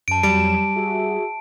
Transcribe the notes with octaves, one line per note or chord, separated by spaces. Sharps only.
F#2 A5 D7
F2 F#3 G3 D7 E7
F#4 G#4 E5